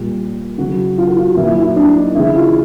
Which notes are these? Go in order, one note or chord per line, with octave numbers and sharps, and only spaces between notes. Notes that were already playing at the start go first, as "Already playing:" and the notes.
Already playing: A#2 G3
C#3 F#3 F#4
F4
F#4
F4
A#2 F#3 E4
E4
D4
D#4
C#3 E3 G#3 E4
F4